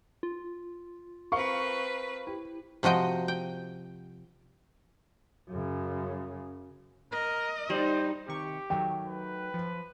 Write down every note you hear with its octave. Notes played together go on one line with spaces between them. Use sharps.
F4
C4 A#4 B4 F5 C#6 C#7
E4 G4
C3 F3 F#4 D#5 G5
G5
F#2 C#3
A#4 D#5
G3 D#4 C5
C3 D#3 G4 C#6
D#3 F#3 A3 G5
B4
F3